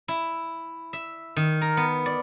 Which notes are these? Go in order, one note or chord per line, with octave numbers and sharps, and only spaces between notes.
E4
E5
D#3
A#4
B3
D5